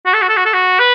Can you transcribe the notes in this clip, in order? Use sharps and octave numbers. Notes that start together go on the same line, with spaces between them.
F#4
A4
F#4
A4
F#4
A4
F#4
B4